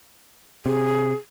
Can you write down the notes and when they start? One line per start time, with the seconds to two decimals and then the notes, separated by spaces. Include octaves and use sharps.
0.66 C3 G#4